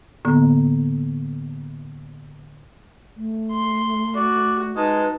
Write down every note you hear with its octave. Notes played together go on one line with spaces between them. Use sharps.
A2 D3 A#3 B3
A3
C6
F#4 D5
G#3 D#4 B4 A5